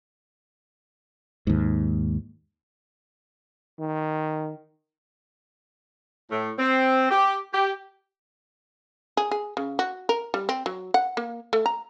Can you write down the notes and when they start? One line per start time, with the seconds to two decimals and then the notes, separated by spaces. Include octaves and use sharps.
1.47 D#2 G#2
3.79 D#3
6.31 A2
6.59 C4
7.11 G4
7.54 G4
9.17 G#4
9.31 G#4
9.57 C#3
9.79 F#4
10.09 A#4
10.34 G3
10.49 C4
10.66 F#3
10.94 F#5
11.17 A#3
11.53 A3
11.66 A#5